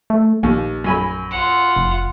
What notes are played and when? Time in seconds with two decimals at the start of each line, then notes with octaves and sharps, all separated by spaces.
0.10 A3
0.43 A#1 D#2
0.84 F#2 G#5 B5
1.31 F4 F#5
1.76 F1